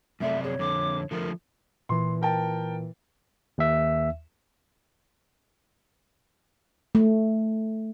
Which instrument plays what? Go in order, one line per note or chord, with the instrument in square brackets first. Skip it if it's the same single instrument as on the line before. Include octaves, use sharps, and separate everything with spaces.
[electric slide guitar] F#2 C3 D5 [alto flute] A3 [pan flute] E5
[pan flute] G#4 [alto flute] C#5
[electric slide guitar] F2 D3 [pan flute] D6
[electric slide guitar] D3 F3 A3 [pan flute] A#4
[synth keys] A#2 E3 [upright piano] C6
[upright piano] A#4 G5 A5
[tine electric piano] D#2 E5
[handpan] A3